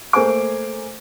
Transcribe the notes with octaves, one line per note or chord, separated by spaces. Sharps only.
A3 A#3 C5 G#5 D6